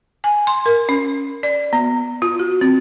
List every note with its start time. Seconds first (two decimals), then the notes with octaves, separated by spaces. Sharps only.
0.24 G#5
0.47 C6
0.66 A#4
0.89 C#4
1.43 D5
1.73 B3
2.22 F4
2.40 F#4
2.61 C4